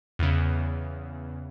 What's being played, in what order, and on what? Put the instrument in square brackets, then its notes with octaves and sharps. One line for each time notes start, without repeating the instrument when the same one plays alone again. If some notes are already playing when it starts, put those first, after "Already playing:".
[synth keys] E2 C#3